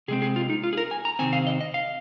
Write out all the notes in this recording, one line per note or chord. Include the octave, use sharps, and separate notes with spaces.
C3 G#3 C4 G#4
G#4
F4
D#4
F4
G#4
A#4
G#5
A#5
C3 D#3 C4 G#5
F5
D#5
D#5
F5